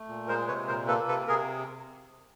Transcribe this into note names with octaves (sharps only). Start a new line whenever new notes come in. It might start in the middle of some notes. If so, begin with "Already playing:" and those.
Already playing: A3
A#2
G#3 A#4 C5
C3 B4 C#5
A#2 A#4 C5
A#3 A4 B4
C3 A4 B4
C3 G#4 A#4